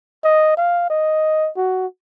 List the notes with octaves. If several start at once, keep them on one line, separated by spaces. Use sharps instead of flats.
D#5
F5
D#5
F#4